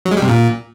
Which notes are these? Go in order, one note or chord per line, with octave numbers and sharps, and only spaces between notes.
F#3
G#3
G3
C3
A#2